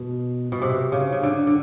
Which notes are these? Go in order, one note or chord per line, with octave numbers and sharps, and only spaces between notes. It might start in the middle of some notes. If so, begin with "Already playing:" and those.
Already playing: B2
B2
C3
C#3
C#3
D3
D3